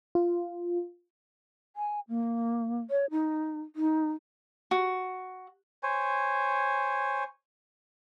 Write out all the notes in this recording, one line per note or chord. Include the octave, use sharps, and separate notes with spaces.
F4
G#5
A#3
C#5
D#4
D#4
F#4
C5 C#5 G#5